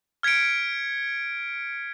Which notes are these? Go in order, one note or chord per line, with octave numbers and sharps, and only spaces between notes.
F6 G#6 B6 C#7 D7